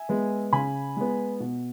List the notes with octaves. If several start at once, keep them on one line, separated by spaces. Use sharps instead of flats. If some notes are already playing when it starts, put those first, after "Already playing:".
Already playing: E5 G#5
G#3 B3
C#3 G#5 B5
G#3 B3
B2